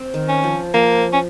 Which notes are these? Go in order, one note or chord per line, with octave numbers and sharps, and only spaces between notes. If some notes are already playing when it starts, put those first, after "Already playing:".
Already playing: C4
D#3
C#4
F3
F3 A#3
C#4